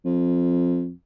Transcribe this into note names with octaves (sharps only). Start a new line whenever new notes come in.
F2